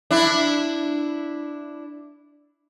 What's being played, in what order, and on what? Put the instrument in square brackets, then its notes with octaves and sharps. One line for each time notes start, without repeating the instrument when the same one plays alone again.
[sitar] D4 E4